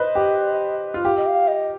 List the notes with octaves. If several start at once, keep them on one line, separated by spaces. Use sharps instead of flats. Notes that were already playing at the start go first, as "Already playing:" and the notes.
Already playing: B4 C5 D#5
G4
F4
G4 F5
D#5
F5
D#5